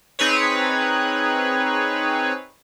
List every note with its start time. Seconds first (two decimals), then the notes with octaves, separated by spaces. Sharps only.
0.19 C4 D#4 G#4 B4 C#5